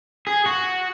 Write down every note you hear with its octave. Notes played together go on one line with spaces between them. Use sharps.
G#4
F#4